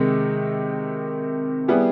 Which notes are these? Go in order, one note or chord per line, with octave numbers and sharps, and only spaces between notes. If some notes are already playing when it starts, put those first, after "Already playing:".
Already playing: C3 D#3 G#3
G3 B3 E4 G#4